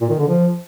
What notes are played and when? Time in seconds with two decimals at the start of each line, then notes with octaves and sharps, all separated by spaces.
0.01 A#2
0.10 D#3
0.19 D3
0.28 F3